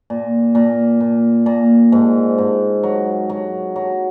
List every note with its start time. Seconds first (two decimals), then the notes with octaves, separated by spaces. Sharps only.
0.10 A#2
0.55 A#2
1.00 A#2
1.46 A#2
1.92 G#2
2.38 G#2
2.83 F#3
3.30 F#3
3.76 F#3